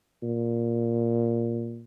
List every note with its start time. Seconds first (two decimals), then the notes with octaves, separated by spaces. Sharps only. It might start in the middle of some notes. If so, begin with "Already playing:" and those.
0.22 A#2